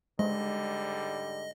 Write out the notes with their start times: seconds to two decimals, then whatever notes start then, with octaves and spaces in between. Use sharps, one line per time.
0.19 G#2 D3 G3 G#3 D#5